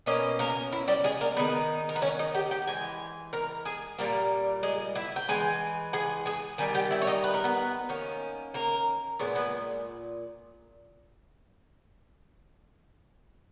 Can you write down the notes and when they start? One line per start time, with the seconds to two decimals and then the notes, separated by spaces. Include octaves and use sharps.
0.06 B2 A#3 C#4 D#5
0.39 A#3 A#4
0.72 E4
0.88 G3 G4
1.04 G#3 G#4
1.21 A#3 A#4
1.37 D#3 G#3 B3 D#4 B4
1.89 A#4
1.96 B4
2.02 C#4 C#5
2.19 D#4 D#5
2.34 G4 G5
2.51 G4 G5
2.67 E3 G#3 G#5
3.33 A#4 A#5
3.65 G#4 G#5
3.98 A#2 G3 A#3 A#4
4.63 G#3 G#4
4.95 E4 E5
5.16 G5
5.29 E3 G#3 G#5
5.93 G#4 G#5
6.26 G#4 G#5
6.58 D#3 G3 G#5
6.75 G4 G5
6.91 E4 E5
7.02 C#5
7.07 D#4 D#5
7.24 B4
7.34 A#4
7.44 B3 B4
7.89 D#3 A#3 C#4
8.54 A#3 A#4
9.19 A#2 G#3 B3 C#5
9.35 B3 B4